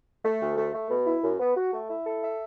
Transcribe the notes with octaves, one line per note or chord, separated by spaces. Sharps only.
A3
D2
A3
A3
B2
E4
F#2
B3
F#4
A3
E4
A4
E5